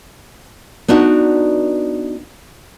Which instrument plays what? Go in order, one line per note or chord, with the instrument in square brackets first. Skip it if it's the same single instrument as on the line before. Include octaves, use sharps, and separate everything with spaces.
[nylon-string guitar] B3 D4 D#4 F#4